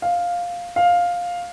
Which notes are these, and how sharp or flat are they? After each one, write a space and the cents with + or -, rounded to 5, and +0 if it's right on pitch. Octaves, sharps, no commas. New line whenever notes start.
F5 +5
F5 +10